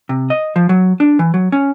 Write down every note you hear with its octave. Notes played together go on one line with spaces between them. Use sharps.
C3
D#5
F3
F#3
D4
E3
F#3
C#4